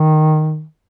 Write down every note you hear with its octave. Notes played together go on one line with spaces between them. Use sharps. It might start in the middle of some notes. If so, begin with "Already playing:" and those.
Already playing: D#3